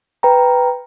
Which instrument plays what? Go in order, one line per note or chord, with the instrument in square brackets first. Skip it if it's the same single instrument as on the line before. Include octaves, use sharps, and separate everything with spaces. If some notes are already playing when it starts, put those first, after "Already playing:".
[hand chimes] B4 G5 A#5